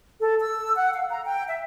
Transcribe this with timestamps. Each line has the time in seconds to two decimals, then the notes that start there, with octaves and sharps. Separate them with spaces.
0.20 A4
0.40 E6
0.76 F#5
0.93 F5
1.11 A#5
1.25 G5
1.47 E5